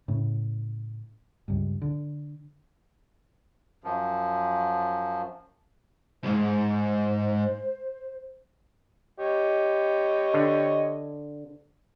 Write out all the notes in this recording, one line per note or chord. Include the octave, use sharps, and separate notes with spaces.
A2 C#3
C#2 G2
D3
F#2 F3
B1 G#2 C5
G4 C#5 D#5
D3